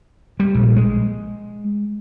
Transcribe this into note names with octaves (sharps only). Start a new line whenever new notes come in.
G3
A#1
G#3